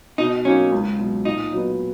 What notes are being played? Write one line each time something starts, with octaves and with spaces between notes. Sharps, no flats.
B2 D#4
F#3 A#3 C#4 D#4
C#2
B2 F#3
A#2 D#4
F#3 B3